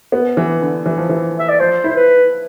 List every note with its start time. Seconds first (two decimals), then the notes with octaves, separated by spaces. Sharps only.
0.12 B3
0.37 E3
0.62 D3
0.86 E3
0.98 F3
1.09 E3
1.39 E5
1.49 D5
1.60 F3 C5
1.84 E4 C5
1.96 B4